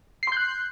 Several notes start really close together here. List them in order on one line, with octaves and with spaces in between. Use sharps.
C7 C6 G6 F#6